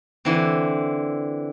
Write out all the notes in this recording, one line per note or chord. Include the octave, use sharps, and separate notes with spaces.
D3 E3 C4